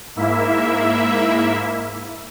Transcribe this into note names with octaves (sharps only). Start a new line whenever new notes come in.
G#2 A#3 E4 E5